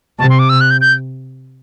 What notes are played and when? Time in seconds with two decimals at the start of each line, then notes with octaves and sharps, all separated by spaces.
0.19 C3 A5
0.29 C6
0.39 D6
0.49 E6
0.61 F#6
0.71 G6
0.81 G6